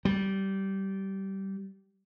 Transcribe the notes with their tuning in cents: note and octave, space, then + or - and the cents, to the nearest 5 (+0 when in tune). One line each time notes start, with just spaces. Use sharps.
G3 -20